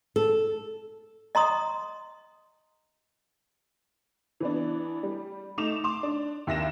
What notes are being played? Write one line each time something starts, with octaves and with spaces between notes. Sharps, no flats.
A4
D#5 A#5 C6 D#6
E3 B3 D4
G3
A3 D#4 D6 E7 F7
C6 D6
D4
D#2 E5 A#6 E7